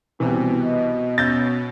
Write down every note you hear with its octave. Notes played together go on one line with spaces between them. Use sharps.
C2 B2 E3 C4
D#5
B2 C#4 E6 G6 A6